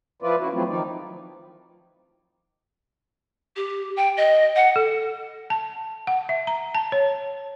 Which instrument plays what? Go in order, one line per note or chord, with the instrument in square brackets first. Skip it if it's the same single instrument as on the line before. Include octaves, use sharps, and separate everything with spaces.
[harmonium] F3 E4 F4 B4 D5
C#3 E4 F#4
F3 F#3 A3 C4 E4 F4
D#3 F3 D#4 D5
[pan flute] G4
G5
D#5
F#5
[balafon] A4
A5
F#5
E5
A#5
A5
C#5